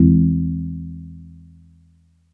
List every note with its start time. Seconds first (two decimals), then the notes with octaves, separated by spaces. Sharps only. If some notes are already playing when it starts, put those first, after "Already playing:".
Already playing: E2 E3 G#3 C4 E4